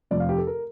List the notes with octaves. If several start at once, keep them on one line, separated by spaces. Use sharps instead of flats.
F1 F2 C3 F3 A3 D5
F5
G4
A4
A#4